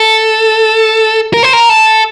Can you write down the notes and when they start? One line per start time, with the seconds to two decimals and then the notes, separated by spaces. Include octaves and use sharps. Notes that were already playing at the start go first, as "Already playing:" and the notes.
Already playing: A4
1.34 A#4
1.43 C5
1.53 A#4
1.69 A4